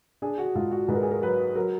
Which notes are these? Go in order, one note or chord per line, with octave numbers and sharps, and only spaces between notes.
D4 G#4
F#4
G#2 F4
F#4
G#2 B4
A#4
G#4
A#4
F#3 B4
F#3 A#4